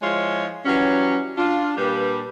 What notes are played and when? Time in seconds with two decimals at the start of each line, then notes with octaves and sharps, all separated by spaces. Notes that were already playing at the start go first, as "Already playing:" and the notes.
0.02 F3 G#3 E4 F4 C5 C#5
0.65 E3 F#3 G3 C#4
1.37 D4 F4
1.77 A#2 G3 D4 G4 B4